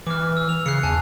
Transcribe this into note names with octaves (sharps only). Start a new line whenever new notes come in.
E3 D6 F6
E6
F7
C#3 F#6 C7 C#7
E2 G#5 A5 F#6